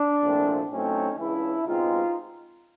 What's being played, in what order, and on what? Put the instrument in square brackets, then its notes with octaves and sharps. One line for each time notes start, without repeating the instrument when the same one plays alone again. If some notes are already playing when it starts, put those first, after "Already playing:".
Already playing: [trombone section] D4
C2 A#2 F3 A3 C4
A2 F#3 A3 C4 C#4 D#4
C#2 C#3 E3 D4 E4
C#2 B2 G#3 C4 D#4 F4